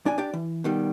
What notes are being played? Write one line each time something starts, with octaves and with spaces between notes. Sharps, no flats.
B1 D4 D5 G#5
D4 G4 D5
E3
B2 D#3 G3